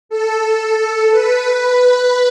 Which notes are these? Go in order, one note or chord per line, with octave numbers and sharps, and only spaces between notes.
A4
B4
B4